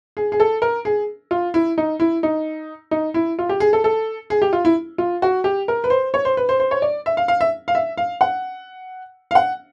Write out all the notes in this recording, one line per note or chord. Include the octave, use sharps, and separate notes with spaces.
G#4
G#4
A4
A#4
G#4
F4
E4
D#4
E4
D#4
D#4
E4
F4
G4
G#4
A4
A4
G#4
G4
F4
E4
F4
F#4
G4
A#4
B4
C5
C#5
C5
B4
C5
C5
C#5
D5
E5
F5
F5
E5
F5
E5
F5
F#5
F5
F#5